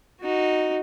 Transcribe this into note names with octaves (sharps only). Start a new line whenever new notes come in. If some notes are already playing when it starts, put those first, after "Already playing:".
D#4 F#4